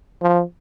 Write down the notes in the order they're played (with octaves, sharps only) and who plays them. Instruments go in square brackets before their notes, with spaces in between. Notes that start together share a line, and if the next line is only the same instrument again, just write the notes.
[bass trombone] F3